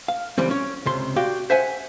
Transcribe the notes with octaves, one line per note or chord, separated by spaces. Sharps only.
F5
C#2 E3 G3 C4
C#4 C#5
C#2 C3 C6
F#4 G4 D5 F5 G5
C5 E5 F#5 G#5